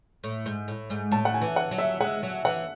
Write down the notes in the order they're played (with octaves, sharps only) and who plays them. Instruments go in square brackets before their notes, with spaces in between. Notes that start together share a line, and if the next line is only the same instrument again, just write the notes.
[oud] A2
G#2
A2
G#2
[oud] A2 [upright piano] A5
[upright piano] F#5
G#5
[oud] E3
[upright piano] F#5
[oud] F#3
[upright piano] E5
[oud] G#3 [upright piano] F#5
[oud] F#3
[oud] E3 [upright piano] F#5